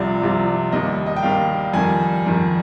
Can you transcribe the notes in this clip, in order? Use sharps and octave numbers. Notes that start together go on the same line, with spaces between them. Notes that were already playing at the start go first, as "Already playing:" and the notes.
Already playing: C2 C3 F3 D5
C2 C3 F3
D#2 D#3 G3 D#5
D#5
G5
D#2 D#3 G3 F5
F2 D#3 G3 G#5
F2 D#3 G3